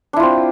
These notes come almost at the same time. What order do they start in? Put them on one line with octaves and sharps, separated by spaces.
D4 E4 F4 C4